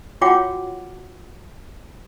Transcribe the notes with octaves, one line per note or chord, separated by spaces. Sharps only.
F4 F#4 C#5 F#5 G5 D6